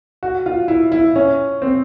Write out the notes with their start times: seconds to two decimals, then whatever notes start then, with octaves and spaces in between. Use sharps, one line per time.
0.23 F#4
0.46 F4
0.68 E4
0.92 E4
1.16 C#4
1.62 C4